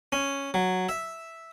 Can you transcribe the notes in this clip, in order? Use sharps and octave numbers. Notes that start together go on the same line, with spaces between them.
C#4
F#3
E5